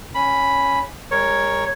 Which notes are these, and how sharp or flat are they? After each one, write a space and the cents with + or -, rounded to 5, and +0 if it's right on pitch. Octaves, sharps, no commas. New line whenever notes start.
C#4 +0 B5 +0
G#3 -40 A#4 +0 C#5 +0